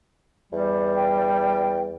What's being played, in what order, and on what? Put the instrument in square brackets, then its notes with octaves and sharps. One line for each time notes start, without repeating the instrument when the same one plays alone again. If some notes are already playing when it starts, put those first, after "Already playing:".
[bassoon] E2 [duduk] G3
[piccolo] G5